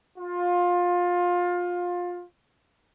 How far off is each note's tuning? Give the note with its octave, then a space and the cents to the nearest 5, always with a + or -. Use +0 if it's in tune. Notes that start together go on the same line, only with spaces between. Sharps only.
F4 +20